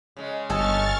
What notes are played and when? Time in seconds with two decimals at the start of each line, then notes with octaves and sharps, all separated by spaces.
0.17 C#3 G#3
0.50 G1 A4 D#5 G#5 C#6 F6 A6